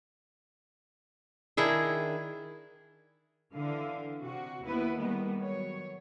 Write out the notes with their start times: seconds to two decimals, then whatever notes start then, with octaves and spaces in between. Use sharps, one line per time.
1.57 D#3 D4 E4 G#4
3.54 D3 E3 F5
4.20 C3 F#4
4.64 D#2 B3 E4 B4
4.97 D#3 G3 G#3 A#3 B3
5.41 F#3 C#5